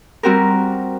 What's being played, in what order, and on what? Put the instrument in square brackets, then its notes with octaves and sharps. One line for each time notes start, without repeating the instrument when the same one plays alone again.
[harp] G3 C4 F#4 G4 A#4